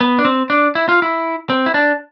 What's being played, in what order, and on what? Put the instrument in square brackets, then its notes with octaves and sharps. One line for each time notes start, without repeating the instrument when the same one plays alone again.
[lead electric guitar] B3
D4
C4
D4
E4
F4
E4
C4
E4
D4